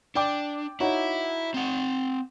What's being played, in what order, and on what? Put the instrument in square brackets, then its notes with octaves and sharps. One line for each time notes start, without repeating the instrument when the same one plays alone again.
[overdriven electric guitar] D4 [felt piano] D5 G5 D6
[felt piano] D#4 F#4 C#5 [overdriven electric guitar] E4
[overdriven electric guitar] C4 F#5